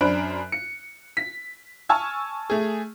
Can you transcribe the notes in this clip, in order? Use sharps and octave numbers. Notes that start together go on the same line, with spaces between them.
F#2 D4 C5 B5 F#6 D7
C#7
B6
G#5 A5 C#6 E6 F6 G#6
A3 G#4